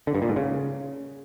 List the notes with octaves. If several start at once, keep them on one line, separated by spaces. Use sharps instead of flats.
D3
G2
A#2
G#2
C#3